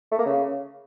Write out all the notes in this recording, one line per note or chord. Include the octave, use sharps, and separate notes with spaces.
A3
A#3
C#3